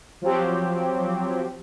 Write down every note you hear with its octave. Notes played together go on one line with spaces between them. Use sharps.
F3 F#3 C4 G4